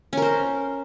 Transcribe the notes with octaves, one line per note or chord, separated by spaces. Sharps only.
C#4 A#4 C5